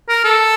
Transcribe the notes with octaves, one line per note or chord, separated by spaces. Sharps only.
A#4
A4